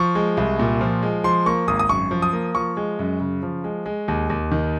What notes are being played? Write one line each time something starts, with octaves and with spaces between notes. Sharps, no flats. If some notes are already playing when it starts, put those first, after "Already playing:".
Already playing: F3 C#6
G#3
C2
A#2
F3
G#3
F3 C6
A#3 C#6
G#1 D#6
D#6
F#2 C#6
F3
D#6
A#3
F3 C#6
G#3
F#2
C#3
F3
G#3
G#3
D#2
D#2
D#3